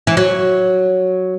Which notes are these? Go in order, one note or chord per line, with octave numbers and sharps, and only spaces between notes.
E3
F#3